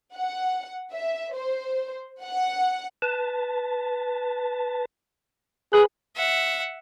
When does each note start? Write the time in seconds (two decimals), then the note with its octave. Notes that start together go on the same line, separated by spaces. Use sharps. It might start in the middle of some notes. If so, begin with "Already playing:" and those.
0.16 F#5
0.93 E5
1.34 C5
2.23 F#5
3.02 B4 A5
5.73 G#4 B4 B5
6.17 E5 F#5